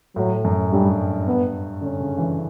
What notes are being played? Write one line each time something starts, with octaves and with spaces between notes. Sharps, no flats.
A2 F#3
F#2
G2 G3
B3
D3 C#4
C#3
E3